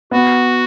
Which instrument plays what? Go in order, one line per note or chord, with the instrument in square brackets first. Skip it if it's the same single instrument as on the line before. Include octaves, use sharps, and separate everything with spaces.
[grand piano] B3 [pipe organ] F#4